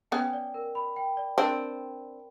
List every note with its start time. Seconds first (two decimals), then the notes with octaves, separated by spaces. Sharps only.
0.11 B3 C#4 G5
0.33 D5
0.54 A#4
0.75 B5
0.96 G5
1.17 D5
1.38 C4 D4 A#4